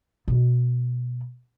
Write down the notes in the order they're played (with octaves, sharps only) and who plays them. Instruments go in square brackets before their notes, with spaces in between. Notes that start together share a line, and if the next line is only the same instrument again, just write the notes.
[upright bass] B2 B3